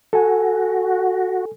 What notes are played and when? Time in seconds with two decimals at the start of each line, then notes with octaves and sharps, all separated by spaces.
0.13 F#4 A4 G#5